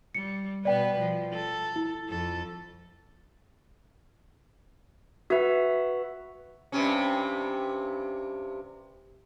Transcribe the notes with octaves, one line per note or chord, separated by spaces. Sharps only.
G3 C#7
B2 B3 B4 D5 G5
F3
A4
E4
F2 A4
F#4 B4 E5 F#5
G2 C3 C#4